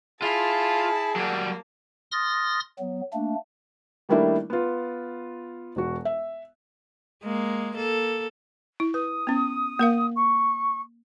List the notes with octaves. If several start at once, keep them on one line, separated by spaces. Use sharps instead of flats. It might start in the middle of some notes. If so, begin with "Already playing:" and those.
E4 F4 G#4 F5 A5
F#3 G3 A#3
C6 D#6 F6 A6 A#6
F#3 B3
A3 A#3 D4
D#3 G3 A3 A#3 D4 E4
B3 F4
E1 F#4
E5
G#3 A#3
A#3 A4
E4
B4 D#6
B3 C#4
A#3 A#4 F5
C#6